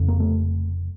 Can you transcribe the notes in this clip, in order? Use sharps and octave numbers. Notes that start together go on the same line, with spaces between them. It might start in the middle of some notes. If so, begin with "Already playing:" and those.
Already playing: F1 F2 C#3
A#3
A3